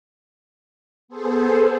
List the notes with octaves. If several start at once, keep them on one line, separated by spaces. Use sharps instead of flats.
B3 G#4 A4 C5